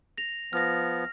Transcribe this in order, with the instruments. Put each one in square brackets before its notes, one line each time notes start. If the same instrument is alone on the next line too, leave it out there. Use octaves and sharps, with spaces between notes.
[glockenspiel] A#6 F7
[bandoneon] F3 B3 [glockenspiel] F6 A#6